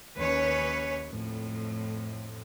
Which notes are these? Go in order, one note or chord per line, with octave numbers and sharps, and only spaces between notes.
D#2 C#4 B4 C#5
F2 A2